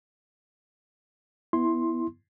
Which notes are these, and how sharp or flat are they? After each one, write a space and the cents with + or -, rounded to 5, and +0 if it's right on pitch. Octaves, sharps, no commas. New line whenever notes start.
B3 +0 E4 +0 C6 +10